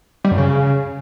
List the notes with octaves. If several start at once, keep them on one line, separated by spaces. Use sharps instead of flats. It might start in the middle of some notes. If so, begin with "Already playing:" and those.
G3
F#2
C#3